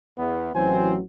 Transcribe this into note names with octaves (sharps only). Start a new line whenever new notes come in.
E2 B3
A1 E3 F#3 C4 C5 G#5